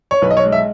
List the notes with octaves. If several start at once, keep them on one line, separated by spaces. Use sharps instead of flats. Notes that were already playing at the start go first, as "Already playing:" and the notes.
C#5
B1 B4
D#5
C#5
G#3
E5